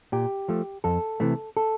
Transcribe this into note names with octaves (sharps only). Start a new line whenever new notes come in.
A#2 G4
F3 A3
F2 A4
C3 E3 A3
A4